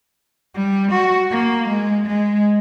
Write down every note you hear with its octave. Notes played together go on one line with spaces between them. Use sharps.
G3
F#4
A#3
G#3
G#3